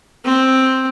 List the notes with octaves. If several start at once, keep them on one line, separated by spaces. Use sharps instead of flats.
C4